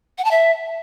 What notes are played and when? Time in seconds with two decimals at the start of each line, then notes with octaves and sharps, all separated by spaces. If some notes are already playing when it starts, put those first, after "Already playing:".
0.18 F#5
0.25 A5
0.31 E5